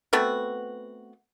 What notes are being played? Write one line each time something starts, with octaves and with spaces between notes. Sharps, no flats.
A3 B3 C4 F#4